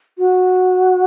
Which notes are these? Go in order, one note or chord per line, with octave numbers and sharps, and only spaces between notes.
F#4